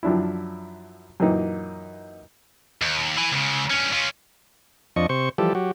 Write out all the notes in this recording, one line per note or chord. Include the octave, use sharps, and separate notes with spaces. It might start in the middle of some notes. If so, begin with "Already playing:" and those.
F#2 F3 D4 E4
F#2 A#2 E3 A#3 D#4
D#2
E4 G#5
C#2 C#3
G2 C#4
C#4 F4
F2 F3 D4 D#5 C#6
C3 C5 C#6
E3 F3 G3 G4 A4
F#3 F#4 G4